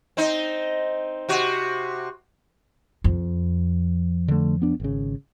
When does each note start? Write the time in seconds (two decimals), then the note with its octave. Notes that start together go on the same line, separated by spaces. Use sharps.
0.17 C4 D#4
1.29 C3 F#4
3.04 F2
4.28 D3 A3
4.62 B3 D4
4.80 G#1 C#3